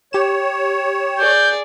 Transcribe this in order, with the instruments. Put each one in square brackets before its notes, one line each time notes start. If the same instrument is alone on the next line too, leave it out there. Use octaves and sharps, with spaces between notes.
[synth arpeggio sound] G4 E7 [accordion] C#5
[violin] G#4 D5 [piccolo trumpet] G6